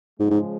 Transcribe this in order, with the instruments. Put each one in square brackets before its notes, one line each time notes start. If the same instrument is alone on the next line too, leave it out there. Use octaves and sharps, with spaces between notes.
[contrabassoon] G#2 [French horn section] C#3 F3 G#3
[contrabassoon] G#2